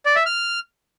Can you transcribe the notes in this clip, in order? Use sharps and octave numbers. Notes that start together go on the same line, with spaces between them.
D5
E5
F6